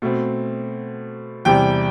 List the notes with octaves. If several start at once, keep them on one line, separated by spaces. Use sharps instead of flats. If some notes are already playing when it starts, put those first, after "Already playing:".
B2 A3 C4
E2 C3 G3 G5